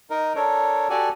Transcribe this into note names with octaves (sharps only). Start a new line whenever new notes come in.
D#4 A#4
D4 A4 A#4 C#5
F#4 G4 A4 D5 G#5